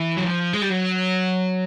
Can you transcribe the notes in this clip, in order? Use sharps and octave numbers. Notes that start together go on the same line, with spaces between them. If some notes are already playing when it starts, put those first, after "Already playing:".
Already playing: E3
F#3
F3
G#3
G3
F#3